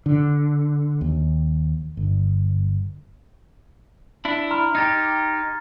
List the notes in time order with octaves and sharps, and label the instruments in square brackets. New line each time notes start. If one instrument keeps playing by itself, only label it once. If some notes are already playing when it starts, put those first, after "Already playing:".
[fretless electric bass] D3
D#2
G1
[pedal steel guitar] D4 E4
[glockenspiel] A#5 C6 F6
[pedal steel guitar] D#4 G4 [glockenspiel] F6 G#6 A6